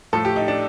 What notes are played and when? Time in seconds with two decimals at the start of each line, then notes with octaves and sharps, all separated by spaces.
0.13 A2 F3 A3 A4
0.25 G4
0.36 D#4
0.48 D4